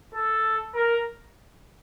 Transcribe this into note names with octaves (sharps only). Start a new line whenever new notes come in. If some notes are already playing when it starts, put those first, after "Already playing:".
A4
A#4